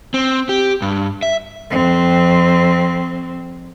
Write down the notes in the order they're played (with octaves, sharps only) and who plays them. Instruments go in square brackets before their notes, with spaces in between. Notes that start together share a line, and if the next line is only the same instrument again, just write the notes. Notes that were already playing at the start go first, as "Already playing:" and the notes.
[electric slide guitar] C4
G4
G2
E5
[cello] F2 C4